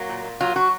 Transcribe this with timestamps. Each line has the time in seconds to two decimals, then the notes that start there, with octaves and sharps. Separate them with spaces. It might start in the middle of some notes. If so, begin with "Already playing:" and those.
Already playing: F#3 A#3
0.09 A#2
0.24 A#2
0.41 F#3 F4
0.56 F#3 F#4